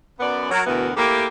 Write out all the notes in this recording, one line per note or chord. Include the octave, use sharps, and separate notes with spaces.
F#2 B3 D5
F#3 A#4
D2 B2 E3 B3 E4 A#4
A3 A#3 E4 G4